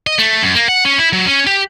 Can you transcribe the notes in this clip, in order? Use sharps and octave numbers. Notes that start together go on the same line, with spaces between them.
D#5
A3
F#2
A#3
F#5
C#4
E4
F#3
C#4
G4